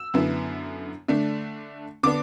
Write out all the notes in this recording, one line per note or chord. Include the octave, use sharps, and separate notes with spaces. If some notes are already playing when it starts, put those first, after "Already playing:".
Already playing: E6
F#2 D3 B3 E4
D3 A3 D4
D3 B3 D4 D6